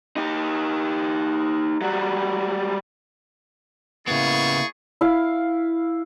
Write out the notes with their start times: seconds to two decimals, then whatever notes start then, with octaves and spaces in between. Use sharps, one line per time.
0.16 D#4 G4
1.81 F#3 G3
4.07 C#3 A#3 B3 E4 G#4 D5 C#6
5.01 E4 F5